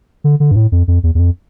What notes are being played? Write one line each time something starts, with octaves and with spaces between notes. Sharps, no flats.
D3
D3
G2
A2
F2
F2
E2
E2
F2